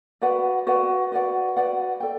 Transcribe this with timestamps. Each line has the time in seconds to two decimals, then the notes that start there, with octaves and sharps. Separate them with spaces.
0.22 F#4 B4 D5 F#5
0.67 F#4 B4 D5 F#5
1.12 F#4 B4 D5 F#5
1.57 F#4 B4 D5 F#5
2.00 A4 D5 G5